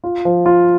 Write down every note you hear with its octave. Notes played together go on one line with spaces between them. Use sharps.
F4
F3
F4